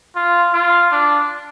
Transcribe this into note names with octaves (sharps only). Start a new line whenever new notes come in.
F4
F4
D4